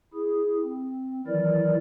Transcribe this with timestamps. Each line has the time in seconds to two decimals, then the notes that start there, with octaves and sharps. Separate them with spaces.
0.14 E4 G#4
0.63 C4
1.27 D#3 E3 F#3 E4 A#4 D5